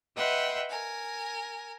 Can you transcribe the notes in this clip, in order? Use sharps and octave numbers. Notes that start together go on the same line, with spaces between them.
B4 D#5 E5 F#5 G5 C6
A#4 G#5